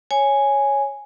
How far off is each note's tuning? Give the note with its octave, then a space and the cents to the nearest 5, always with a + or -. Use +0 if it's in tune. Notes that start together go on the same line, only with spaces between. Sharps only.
C#5 +0 G#5 +0